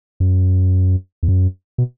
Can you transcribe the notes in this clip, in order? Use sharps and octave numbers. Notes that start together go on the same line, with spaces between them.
F#2
E2
F#2
B2